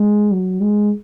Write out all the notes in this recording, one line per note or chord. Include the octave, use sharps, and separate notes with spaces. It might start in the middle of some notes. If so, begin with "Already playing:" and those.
Already playing: G#3
F#3
G#3